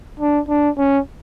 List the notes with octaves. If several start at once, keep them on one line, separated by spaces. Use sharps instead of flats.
D4
D4
C#4